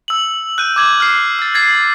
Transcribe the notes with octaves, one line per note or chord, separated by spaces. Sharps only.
E6 F#7
F#6 G6 D#7
D6 G#6 F#7
F6 C7
E6 A6
G#6 A6 C7